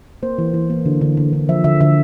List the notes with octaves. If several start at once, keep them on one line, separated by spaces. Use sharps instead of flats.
A#3 C5
E3
E3
A#3
D3
D3
D3
D3
F3 E5
D3 E5
D3 E5